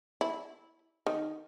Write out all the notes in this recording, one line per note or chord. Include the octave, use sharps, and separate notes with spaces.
E4
D#3